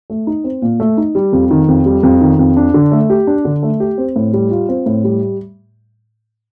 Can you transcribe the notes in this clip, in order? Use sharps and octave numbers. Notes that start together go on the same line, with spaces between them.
A3
D#4
C4
A#2
A3
D#4
G3
F2
D#3
F2
G3
F2
D#3
F2
D4
D3
A3
G4
D4
D3
A3
G4
C4
A2
G3
F4
C4
A2
G3